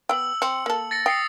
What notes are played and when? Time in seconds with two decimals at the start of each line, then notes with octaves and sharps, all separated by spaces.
0.09 B3 G5 E6 F#7
0.42 C4 C#7
0.66 A#3 A4
0.91 A6 A#6 C#7
1.06 G5 D#6 C7 C#7